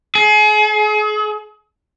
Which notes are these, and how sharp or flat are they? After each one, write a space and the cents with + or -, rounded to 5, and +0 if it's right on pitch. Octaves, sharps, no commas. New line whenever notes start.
G#4 +35